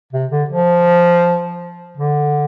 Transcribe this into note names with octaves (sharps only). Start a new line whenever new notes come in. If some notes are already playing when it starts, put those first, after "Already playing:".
C3
D3
F3
D3